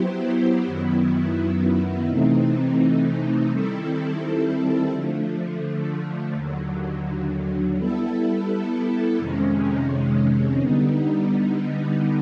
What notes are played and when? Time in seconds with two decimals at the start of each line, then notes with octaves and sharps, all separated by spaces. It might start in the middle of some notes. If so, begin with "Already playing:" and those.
Already playing: F#3 B3 E4 G4 C5
0.66 F#2 D#3 F#3 B3 E4
2.08 C3 E3 A3 C4 D#4
3.50 D#3 G3 C4 E4 A4
4.92 D3 F3 A3
6.34 D#2 D3 F#3
7.77 G3 B3 E4 A4
9.19 F2 C3 D#3 G#3 C#4
10.60 D3 G3 B3 D#4